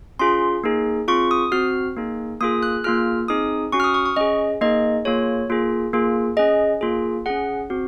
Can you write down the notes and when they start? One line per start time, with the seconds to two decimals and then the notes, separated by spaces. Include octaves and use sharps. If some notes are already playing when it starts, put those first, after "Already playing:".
0.19 C#4 F4 G#4 C6
0.64 A#3 D#4 G#4
1.08 C4 F4 G#4 C#6
1.31 D#6
1.52 C4 F#4 F6
1.97 A#3 D#4 G#4
2.40 A#3 F4 G#4 D#6
2.63 F#6
2.84 A#3 F4 G#4 F6
3.28 C4 D#4 G#4 D#6
3.72 C#4 F#4 C#6
3.80 F6
3.84 D#6
3.94 C#6
4.06 C#6
4.16 C#4 G#4 D#5
4.61 A#3 D#4 G#4 D#5
5.05 A#3 F4 G#4 C#5
5.50 A#3 F4 G#4
5.93 A#3 F4 G#4
6.37 C#4 G#4 D#5
6.81 A#3 F4 G#4
7.26 C#4 G#4 F#5
7.70 C4 F#4